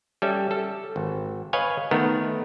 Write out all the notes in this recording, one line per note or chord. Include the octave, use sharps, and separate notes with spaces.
G3 C#4 A4 E5
A4
G#1
B4 C#5 D#5 F5 G#5
D#3 A3 B3 A#4